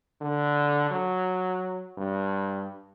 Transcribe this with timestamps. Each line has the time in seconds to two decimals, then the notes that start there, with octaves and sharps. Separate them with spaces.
0.21 D3
0.90 F#3
1.98 G2